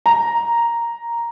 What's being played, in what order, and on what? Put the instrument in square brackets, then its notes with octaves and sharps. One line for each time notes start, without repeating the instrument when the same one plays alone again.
[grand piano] A#5